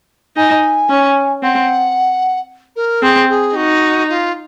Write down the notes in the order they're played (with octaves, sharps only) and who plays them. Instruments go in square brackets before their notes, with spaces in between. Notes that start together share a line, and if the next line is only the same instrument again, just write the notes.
[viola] D#4 [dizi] G#5
[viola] C#4
[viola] C4 [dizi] F#5
[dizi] A#4
[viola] C4 [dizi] G#4
[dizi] G#4
[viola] D#4 [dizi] F#4
[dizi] F4